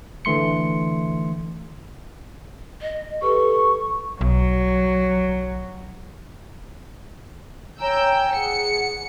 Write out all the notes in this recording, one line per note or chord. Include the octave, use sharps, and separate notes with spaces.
D3 E3 A3 C6 C#7
D#5
G4 A4 B4 C#6
B1 F#3
C#5 G5 G#5 A#5 E6 G6
G#4 F#5 C#7